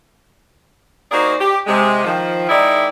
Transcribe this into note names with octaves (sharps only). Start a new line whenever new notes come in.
A#3 D#4 F#4 G#4 C5 D5
G4
C3 G#3
D#3 F3
D#3 G#3 D#4 E4 D5